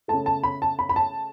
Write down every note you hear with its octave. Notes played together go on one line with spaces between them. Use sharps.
C#3 A3 A5
A5
B5
A5
B5
B5
A5